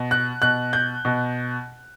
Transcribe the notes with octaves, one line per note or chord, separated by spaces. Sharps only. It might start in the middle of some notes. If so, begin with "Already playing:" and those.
Already playing: B2
F#6
B2 F#6
G6
B2